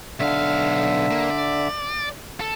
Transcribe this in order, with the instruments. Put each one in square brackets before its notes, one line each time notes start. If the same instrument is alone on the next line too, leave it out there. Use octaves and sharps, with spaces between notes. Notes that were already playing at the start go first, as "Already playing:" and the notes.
[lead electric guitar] B1 F5 [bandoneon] D3 E5
[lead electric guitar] A#3
D5
A4